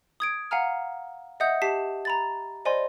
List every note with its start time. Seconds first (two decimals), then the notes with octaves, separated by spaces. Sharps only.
0.20 D#6 G#6 D7
0.51 F5 F#5 G#5 A#5 F6
1.40 D#5 E5 F#5 D#6 G6
1.62 G4 A5 B6 C7
2.05 A#5 B5 A6
2.65 C5 D5 D#5 G#5 B5 C6